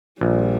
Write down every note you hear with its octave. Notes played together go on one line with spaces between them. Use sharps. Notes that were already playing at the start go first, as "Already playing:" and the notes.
A#1 G3